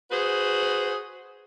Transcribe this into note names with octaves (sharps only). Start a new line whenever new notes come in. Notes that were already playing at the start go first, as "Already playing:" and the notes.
F#4 G#4 B4 C5